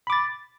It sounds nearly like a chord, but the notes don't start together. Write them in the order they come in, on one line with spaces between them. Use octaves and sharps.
B5 D6 A6